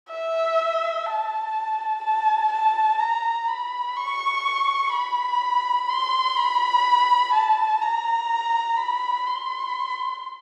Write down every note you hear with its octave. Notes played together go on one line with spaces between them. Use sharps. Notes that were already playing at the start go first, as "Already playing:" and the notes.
E5
A5
A5
A5
A#5
B5
C#6
B5
C6
B5
A5
A#5
B5
C6